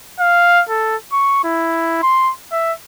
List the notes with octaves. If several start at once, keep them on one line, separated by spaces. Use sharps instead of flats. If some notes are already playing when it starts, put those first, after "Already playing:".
F5
A4
C#6
E4
C6
E5